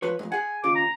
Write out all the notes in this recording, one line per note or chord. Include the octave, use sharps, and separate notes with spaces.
F3 B4 C#5
F2 G#2
G#4 F#5 G#5
D#2 C#3 F4 D6
A#5